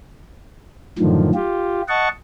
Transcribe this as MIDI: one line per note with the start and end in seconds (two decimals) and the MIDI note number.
0.98 1.30 42
0.98 1.30 45
0.98 1.30 50
0.98 1.30 51
0.98 1.30 53
1.34 1.82 65
1.34 1.82 67
1.88 2.08 75
1.88 2.08 78
1.88 2.08 81
1.88 2.08 85